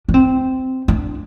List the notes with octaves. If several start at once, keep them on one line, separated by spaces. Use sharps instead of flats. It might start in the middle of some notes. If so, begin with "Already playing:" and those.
D4
C4
D4